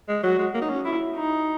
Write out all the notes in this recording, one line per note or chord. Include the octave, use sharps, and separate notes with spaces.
G#3
F#3 F#4
G#3
A#3
D#4
C#4
E4
D#4